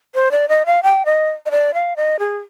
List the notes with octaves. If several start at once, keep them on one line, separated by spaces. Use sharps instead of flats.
C5
D5
D#5
F5
G5
D#5
D#5
D5
F5
D#5
G#4